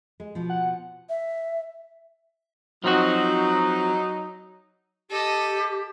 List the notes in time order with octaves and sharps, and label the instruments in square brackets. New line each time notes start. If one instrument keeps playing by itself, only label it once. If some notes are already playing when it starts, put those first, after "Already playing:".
[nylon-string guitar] G#3
B2 F3
[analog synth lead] F#5
[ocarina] E5
[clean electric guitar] F3 C4 F#4 [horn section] F#3 D#4
[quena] G4 [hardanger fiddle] A4 D#5